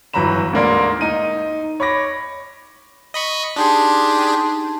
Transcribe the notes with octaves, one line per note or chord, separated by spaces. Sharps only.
G1 E3 F#3 A#5 B5 E7
D2 G#2 A#3 D5 C6
D#4 D#7
C#5 B5 D6 A#6
D#5 B5 C#6
D4 D#4 G4 G#4 A5 C6